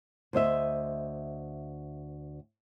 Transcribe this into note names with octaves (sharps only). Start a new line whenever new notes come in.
D2 C5 D#5 E5